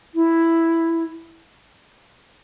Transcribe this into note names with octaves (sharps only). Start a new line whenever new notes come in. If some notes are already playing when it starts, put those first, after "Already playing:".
E4